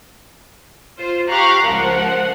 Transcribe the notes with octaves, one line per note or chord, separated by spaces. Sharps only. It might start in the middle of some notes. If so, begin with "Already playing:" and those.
F4 C5
G4 F5 A#5 C#6 F#6
C#2 F3 A#4 F#5